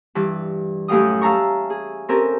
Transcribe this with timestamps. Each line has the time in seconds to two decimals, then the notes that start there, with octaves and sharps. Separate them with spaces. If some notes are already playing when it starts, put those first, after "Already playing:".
0.15 G2 E3
0.88 F#2 A2 G4 F5 G5 D#6
1.22 E5 F5 A5 A#5 C#6
1.70 G#4
2.09 C4 C#4 G4 A4 A#4